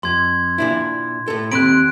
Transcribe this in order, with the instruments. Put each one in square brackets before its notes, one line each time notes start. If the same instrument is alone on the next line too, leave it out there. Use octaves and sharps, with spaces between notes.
[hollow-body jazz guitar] F2 [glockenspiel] C6 G#6
[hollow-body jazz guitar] A#2 D4 E4
A2 A4
[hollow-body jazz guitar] D#2 C4 B5 [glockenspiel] F#6 D7